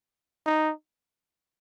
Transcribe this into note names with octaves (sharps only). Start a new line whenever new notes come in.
D#4